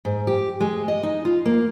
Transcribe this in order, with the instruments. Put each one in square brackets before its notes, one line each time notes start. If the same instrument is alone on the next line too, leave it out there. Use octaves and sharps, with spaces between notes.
[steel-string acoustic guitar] G#2
G4
G#3
D#5
D#4
F4
A#3